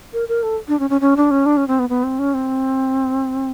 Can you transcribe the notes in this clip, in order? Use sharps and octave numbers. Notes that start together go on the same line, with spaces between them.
A#4
A#4
A4
D4
C#4
C#4
C#4
D4
C#4
D4
C#4
C4
B3
B3
C4
C#4
C4